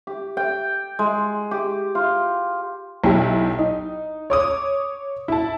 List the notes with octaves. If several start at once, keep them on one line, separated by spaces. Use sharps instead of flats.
G4
G5
G#3
G4
F4
B1 E4 G4
D#4
C#5 D6 D#6
E4 A5